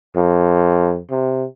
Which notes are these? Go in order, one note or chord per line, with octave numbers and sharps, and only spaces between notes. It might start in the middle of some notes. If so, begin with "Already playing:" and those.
F2
C3